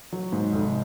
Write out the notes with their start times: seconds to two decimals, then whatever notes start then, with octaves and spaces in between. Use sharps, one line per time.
0.12 F#3
0.32 G#2
0.53 F1